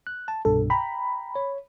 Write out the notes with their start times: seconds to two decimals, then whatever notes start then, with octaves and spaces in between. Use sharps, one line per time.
0.07 F#6
0.28 A5
0.45 C2 G2 B2 A4
0.70 G5 A#5 B5
1.35 C#5